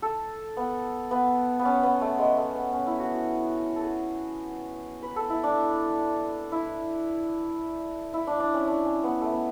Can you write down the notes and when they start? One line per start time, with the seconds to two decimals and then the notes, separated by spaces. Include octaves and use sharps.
0.02 A4
0.57 B3
1.11 B3
1.59 B3
1.65 C#4
1.83 B3
2.01 A3
2.18 G#3
2.37 A3
2.55 B3
2.73 C#4
2.87 E4
2.99 F#4
3.14 F#4
3.76 A4
3.81 G#4
5.03 B4
5.16 A4
5.30 E4
5.43 D4
6.52 E4
8.14 E4
8.27 D4
8.40 D4
8.54 C#4
8.67 D4
8.85 C#4
9.04 B3
9.21 A3
9.32 B3